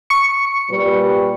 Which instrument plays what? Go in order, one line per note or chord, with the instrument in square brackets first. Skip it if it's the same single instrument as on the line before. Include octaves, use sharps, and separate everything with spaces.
[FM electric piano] C#6 C#7
[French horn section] A#2 G3 B4